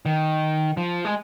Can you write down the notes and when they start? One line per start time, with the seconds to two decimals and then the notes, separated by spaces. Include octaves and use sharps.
0.06 D#3
0.77 F3
1.05 G#3